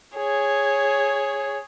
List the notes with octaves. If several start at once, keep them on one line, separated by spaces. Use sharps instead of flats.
G#4 C#5